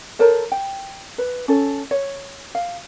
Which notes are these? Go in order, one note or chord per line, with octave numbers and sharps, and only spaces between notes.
A4 A#4 C5 C#5
G5
B4
C#4 A4
C#5
F5